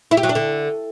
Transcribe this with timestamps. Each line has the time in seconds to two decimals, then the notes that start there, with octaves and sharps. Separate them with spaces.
0.11 E4
0.17 G4
0.23 F#3
0.29 D4
0.35 D3